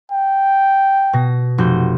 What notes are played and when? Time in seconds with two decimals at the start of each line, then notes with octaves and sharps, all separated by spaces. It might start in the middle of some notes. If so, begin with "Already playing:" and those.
0.11 G5
1.13 B2 A#6
1.58 F1 F#4 G6